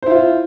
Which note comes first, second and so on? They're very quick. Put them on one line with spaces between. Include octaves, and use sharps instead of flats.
C5 E4 F4